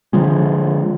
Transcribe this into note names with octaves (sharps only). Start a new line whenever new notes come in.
D3 F3 G#3